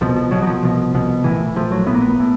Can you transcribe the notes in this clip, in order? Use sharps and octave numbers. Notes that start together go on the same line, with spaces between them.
C2 B2 F3
F3
C2 B2 F#3
F#3
F3
C2 B2
C2 B2
A#1 A2 E3
A#1 A2 F3
F#3
A2 B3
A#1 A#3
B3
A2